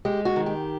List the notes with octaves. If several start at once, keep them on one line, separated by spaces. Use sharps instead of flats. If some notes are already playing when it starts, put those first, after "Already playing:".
G#3 G4
F#4
D#3
G4